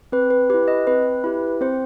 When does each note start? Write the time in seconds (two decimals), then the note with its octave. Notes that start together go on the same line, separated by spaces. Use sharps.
0.12 C4 B4
0.30 B4
0.50 E4 G4 B4
0.68 D#5
0.87 C4 B4
1.24 E4 G4
1.61 C4 C5